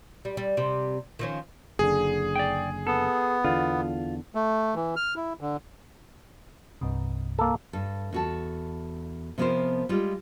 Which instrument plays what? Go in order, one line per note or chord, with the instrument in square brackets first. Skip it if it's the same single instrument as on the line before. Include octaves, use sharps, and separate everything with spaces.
[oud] G3
G3
C3 G3
D#3 F3 C#4
[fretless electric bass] F#1 D3 [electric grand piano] G#4
[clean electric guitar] D5 G5
[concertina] B3 [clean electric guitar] A4
[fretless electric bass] E2 D3 [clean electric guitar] F4
[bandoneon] A3
E3
F6
E4
D3
[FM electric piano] C2 G2 C3
[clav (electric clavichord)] A#3 A4
[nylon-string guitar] G2 A4
E2 F#4 A4
C3 F3 B3 C4 A#4 C5
G3 G#3 F4